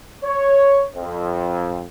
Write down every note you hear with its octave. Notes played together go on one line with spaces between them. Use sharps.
C#5
F2